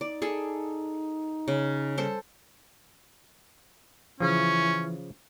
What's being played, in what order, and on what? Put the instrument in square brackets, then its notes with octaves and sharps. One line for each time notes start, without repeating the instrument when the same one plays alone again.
[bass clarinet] D#4 [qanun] D5
[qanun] G#4 A4
C#3
[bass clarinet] G3 [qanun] A4 C5
[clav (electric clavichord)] C#3 F3 [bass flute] E3 [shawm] C#4